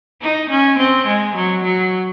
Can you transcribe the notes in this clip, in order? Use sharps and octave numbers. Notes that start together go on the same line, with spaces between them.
D#4
C#4
C4
G#3
F#3
F#3